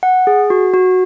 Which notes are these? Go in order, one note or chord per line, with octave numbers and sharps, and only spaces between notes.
F#5
G#4
F#4
F#4